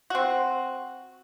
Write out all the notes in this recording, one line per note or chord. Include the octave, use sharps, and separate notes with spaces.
C4 F#4